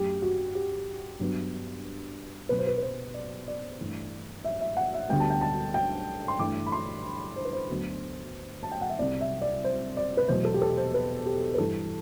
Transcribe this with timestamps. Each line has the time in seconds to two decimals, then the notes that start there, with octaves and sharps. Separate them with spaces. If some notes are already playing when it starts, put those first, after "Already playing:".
Already playing: F#2 F#3 A3 G4
0.22 F#4
0.55 G4
1.20 G2 F#3 B3
2.49 B2 F#3 B3 B4
2.59 C5
2.67 B4
2.78 B4
2.82 C5
3.14 D5
3.48 D5
3.80 G2 E3 A3
4.44 E5
4.61 E5
4.77 F#5
4.94 E5
5.09 D2 D3 G3 B3 G5
5.20 A5
5.30 G5
5.41 A5
5.74 G5
6.28 C6
6.39 G2 E3 A3 D6
6.66 B5
6.72 C6
7.36 C5
7.45 B4
7.53 C5
7.69 D2 D3 F#3 B3
8.63 A5
8.72 G5
8.81 F#5
8.89 E5
8.99 C2 C3 G3 D5
9.21 E5
9.42 D5
9.64 C5
9.97 D5
10.17 B4
10.28 E2 B2 F#3 A3 C5
10.45 A4
10.54 G4
10.62 A4
10.78 C5
10.94 B4
11.26 G4
11.54 B4
11.58 G2 E3 G3 A4